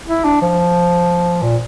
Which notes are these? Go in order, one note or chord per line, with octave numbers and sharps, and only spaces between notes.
E4
D4
F3
A#2